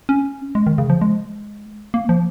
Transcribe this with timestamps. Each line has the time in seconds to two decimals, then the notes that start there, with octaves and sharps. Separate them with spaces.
0.09 C#4
0.55 G#3
0.67 D#3
0.78 C#3
0.90 F3
1.01 G#3
1.94 A#3
2.09 F3